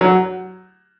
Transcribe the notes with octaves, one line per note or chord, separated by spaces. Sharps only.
F#3